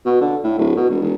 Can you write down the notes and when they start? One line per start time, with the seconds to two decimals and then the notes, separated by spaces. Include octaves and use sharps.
0.05 B2
0.21 D3
0.44 A2
0.59 D1
0.76 B2
0.90 E1
1.02 E1